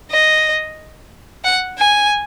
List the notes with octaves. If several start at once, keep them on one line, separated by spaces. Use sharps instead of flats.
D#5
F#5
G#5